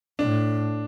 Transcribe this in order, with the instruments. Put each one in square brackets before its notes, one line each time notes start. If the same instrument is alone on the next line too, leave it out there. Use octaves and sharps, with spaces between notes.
[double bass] A2 [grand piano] D4